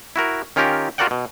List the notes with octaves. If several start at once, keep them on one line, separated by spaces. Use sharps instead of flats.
E4 F#4 A#4
D#3 C#4 F4 G4 A#4
F4 F#4 A#4 D5 F#5 G5
B2